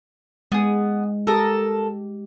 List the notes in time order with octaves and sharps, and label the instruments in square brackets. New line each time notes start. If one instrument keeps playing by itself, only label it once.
[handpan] G#3 [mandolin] B3 G#4
[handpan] G4 [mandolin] A4 A#4 D#6